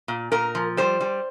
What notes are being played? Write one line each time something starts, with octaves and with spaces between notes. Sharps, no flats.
A#2
A#2 A#4
F3
G3 C5
G3